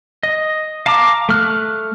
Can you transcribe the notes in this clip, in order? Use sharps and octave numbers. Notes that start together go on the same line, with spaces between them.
D#5
F5 A5 A#5 D6
A3 F6 F#6